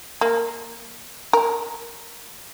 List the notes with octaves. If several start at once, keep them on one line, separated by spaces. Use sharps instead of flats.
A#3
A#4